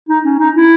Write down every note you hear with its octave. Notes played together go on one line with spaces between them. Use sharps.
D#4
C#4
D#4
E4